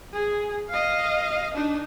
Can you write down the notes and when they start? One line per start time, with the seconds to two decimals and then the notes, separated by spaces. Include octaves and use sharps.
0.13 G#4
0.69 D#5 F5
1.54 D4 D#4